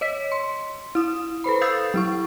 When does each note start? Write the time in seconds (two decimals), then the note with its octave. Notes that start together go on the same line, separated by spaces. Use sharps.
0.01 C#5 D#5 B6
0.32 C6
0.95 E4 D#6
1.44 A4 B4 C5 B5
1.61 F5 D#6 E6 G6 A6 C7
1.94 F#3 E4 C#6